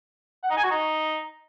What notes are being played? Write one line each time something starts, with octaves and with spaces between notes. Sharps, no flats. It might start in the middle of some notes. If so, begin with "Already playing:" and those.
F#5
D#4
G#5
F#4
D#4